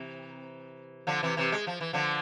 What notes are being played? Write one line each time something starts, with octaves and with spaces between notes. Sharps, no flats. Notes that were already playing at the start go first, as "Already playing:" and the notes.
Already playing: C3 E3
D3 F3
C3 E3
C3 E3
G#3
F3
E3
D3 F3